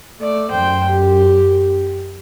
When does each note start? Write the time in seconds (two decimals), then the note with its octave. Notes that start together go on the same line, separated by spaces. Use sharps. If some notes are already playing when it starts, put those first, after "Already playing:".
0.20 A3 D5
0.50 F#2 C5 G5
0.89 G4